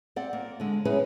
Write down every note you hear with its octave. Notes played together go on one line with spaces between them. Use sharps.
C4 D5 F#5
A#3
D3 G#3
F#3 C#4 E4 G#4 B4 C#5